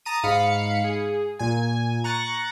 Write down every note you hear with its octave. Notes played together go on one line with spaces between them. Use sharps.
A5 A#5 D#6 D#7
G#2 F5 B5 C#7
G#4
A#2 G#5
A#5 C#6 F#6 A6